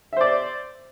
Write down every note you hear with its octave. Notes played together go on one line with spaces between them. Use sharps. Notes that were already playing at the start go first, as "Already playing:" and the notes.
C5 D5 E5